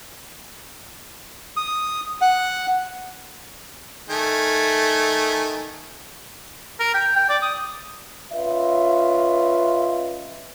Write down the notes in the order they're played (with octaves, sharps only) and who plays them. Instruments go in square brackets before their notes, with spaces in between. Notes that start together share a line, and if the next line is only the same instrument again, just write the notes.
[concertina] D#6
F#5
[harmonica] D#3 A3 G#5
[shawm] A#4
G5
G5
D5
D#6
[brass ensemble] C#4 F4 B4 D#5 E5